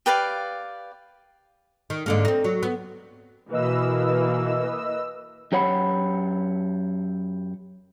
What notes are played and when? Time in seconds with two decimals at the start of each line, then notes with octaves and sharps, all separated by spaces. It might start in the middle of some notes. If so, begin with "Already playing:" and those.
0.06 G4 B4 D5 F5
1.90 D#3
2.06 G#2 D3 A#3
2.25 C4 D#4
2.44 F#3
2.63 B3
3.51 B2 E3 A#3 B4 D#5 E6
5.52 F#2 G4 C#5 F#5 B5